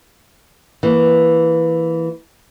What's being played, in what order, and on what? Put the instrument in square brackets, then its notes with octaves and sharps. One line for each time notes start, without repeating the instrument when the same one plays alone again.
[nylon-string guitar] E3 A#3